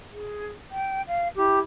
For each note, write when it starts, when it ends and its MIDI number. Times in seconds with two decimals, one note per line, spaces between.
0.11 0.48 68
0.71 1.02 79
1.08 1.29 77
1.37 1.60 64
1.37 1.59 67